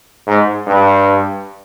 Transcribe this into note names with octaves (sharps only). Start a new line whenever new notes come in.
G#2
G2